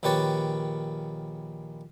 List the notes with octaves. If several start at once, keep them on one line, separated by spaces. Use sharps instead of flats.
A#1 D#3 G4 B4 C#5 A5